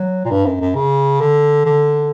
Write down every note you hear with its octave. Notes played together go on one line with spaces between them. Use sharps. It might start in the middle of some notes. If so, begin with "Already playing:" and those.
Already playing: F#3
A#2
G2
F#2
F#2
C#3
D3
D3